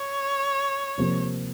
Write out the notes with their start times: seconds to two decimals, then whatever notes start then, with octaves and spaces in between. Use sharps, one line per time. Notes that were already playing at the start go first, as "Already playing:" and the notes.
Already playing: C#5
0.98 C3 F3 A#3